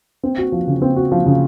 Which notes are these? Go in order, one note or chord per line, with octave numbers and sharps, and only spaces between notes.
C4
F#4
F3
C#3
C4
F#4
F3
C#3